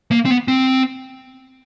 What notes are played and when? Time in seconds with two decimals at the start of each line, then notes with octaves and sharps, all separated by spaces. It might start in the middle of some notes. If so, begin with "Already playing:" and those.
0.12 A#3
0.25 C4
0.30 B3
0.48 C4